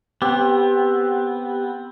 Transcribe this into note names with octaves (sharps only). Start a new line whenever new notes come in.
B3 C4 G4